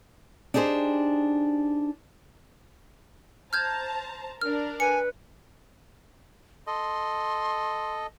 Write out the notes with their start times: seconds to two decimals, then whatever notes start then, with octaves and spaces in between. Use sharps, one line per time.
0.54 D4 D#4 G4 G#4 C5
3.53 C5 A5 A#5 F6 G6 G#6
4.41 D4 A#4 F6
4.80 B4 G#5 C#7
6.67 A4 D#5 C6